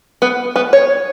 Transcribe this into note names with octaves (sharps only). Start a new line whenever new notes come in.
B3
B3
C#5